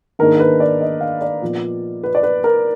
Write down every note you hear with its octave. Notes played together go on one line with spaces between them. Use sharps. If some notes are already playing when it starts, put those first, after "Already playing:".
G#2 D#3 A#3 D4 A#4
B4
D5
D#5
F5
D5
A#2 F3 B3
B4
D5
B4
A#4